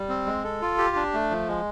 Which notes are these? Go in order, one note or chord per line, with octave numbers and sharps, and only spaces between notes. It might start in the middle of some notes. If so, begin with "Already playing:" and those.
Already playing: G3
C4
G#3
A4
F4
G4
D4
A3
F3
G#3